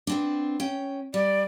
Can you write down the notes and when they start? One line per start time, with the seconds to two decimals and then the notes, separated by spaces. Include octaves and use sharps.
0.07 B3 C4 D4
0.60 C#4 G5
1.14 G3 D5